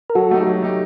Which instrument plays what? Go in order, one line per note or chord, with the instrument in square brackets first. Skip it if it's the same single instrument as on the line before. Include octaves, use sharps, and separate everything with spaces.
[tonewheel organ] A#4
[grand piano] F#3 [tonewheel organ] F#4 A4
[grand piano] A3 D#4 G4
F#3
A3 D#4 G4